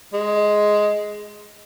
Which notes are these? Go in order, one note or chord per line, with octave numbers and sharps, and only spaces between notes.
G#3